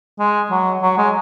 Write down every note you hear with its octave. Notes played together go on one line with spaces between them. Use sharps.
G#3
F#3
F#3
G#3